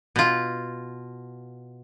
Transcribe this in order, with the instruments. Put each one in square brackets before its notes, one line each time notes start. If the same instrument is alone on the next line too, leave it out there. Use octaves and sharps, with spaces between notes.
[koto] B2 F4